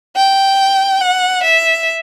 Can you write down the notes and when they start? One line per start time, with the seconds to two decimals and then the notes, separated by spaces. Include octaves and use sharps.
0.17 G5
1.01 F#5
1.43 E5